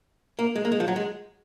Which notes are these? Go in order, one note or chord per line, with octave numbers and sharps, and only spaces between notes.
A#3
G#3
A#3
G#3
F3
F#3
G#3